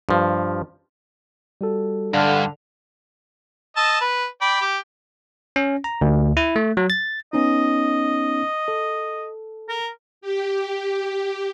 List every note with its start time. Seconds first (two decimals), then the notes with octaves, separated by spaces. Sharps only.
0.09 G2 F3
1.61 G3 F#4 A4
2.14 G2 D3 F5 F6
3.77 D#5 A5 E6
4.01 B4
4.41 D5 G5 B5
4.61 G4
5.56 C#4
5.84 A#5
6.01 D2
6.37 E4
6.56 A3
6.77 F#3
6.90 A6
7.33 B3 C#4 D#4 D#5
8.68 A4
9.69 A#4
10.21 G4